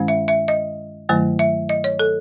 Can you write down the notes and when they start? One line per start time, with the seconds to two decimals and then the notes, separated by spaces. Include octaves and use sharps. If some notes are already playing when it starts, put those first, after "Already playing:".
Already playing: G2 D#3 G#3 C#4
0.08 E5
0.28 E5
0.48 D#5
1.09 G2 D#3 F#3 A3
1.39 E5
1.69 D#5
1.84 C#5
1.99 A4